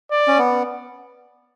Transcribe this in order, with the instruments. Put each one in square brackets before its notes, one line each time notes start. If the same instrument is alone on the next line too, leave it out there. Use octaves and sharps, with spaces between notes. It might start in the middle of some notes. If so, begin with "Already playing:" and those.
[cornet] D5
[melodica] C#4
B3